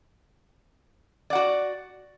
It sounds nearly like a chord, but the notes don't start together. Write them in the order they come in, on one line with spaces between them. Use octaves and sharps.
D5 F#5 F#4